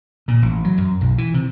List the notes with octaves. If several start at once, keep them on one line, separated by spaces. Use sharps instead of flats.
A#2
A1
F#3
F#2
B1
E3
C3